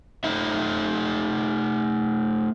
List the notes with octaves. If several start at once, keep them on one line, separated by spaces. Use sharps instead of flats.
A3 D#4 E5